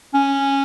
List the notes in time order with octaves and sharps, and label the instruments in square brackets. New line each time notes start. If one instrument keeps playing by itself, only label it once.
[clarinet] C#4